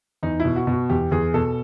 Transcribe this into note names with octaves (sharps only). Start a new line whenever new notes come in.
E2 D#4
E4
B2
F#4
B2
F#4
E2 G4
E2 G#4
B2 A4